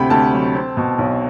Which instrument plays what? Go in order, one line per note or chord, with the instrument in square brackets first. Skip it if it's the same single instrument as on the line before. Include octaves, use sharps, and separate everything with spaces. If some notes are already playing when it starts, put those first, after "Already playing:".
Already playing: [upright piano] D2 C3 G5 B5
D2 A5
F#3
C4
B2
B1